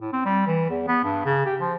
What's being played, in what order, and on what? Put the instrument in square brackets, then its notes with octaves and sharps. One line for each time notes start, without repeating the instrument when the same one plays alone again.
[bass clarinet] A2
C4
G3
E3
E2
B3
G2
C#3
G4
F3